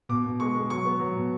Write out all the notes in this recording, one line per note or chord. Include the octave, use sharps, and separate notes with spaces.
B2 D6
B2
G#3 C#6
G#3
F#3 C#6
B3
F#3
B2